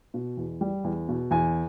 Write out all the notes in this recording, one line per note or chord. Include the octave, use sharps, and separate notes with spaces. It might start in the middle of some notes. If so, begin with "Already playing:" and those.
B2
E2
G3
E2
B2
E2 G#5